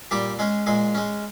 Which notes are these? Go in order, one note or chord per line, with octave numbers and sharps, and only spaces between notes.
A#2 G3 G4
G#3 C#4 G#4
A#2 G#3 G#4
G#3 C#4